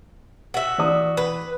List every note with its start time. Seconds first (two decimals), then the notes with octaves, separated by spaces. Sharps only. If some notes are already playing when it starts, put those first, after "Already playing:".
0.54 F#4 E5
0.78 E3 D5 D#6
1.17 B4